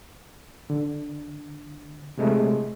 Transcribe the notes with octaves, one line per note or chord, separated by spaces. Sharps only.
D3
C3 G#3 A3